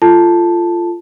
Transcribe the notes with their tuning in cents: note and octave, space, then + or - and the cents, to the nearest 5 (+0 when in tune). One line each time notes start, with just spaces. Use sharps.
F4 -15 A4 +0 A5 +0